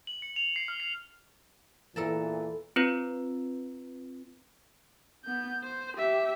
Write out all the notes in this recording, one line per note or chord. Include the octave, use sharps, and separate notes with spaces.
F#7
C#7
F7
C7
F6
C7
E2 A#2 E3 A4 A#4 A5
C4 F4 B4
B3 G6
C5
G4 E5